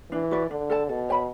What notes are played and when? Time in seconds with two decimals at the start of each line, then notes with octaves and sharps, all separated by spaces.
0.12 E3 D4
0.31 F#4 B4 D5
0.50 D3 D4
0.70 A4 D5 A5
0.89 B2 A4
1.09 C#5 G5 B5